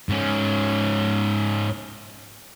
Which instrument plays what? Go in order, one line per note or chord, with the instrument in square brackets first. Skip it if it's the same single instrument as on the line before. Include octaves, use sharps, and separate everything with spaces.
[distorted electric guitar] G#2 C#4